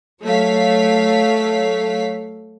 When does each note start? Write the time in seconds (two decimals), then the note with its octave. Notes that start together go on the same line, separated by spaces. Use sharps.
0.22 F#3 A3 C#5 F5 B6